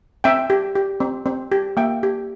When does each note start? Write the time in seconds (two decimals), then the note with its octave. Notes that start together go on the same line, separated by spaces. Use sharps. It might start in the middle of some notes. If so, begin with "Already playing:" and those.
0.24 C4 E5 G5
0.50 G4
0.75 G4
1.00 C4
1.26 C4
1.52 G4
1.77 A#3 E5 G5
2.03 G4